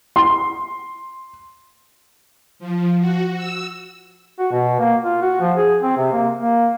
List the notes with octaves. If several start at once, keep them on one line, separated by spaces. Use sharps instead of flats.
C6
F3
F#4
E6
F#4
B2
A#3
F4
F#4
F3
G#4
C4
C3
A#3
A#3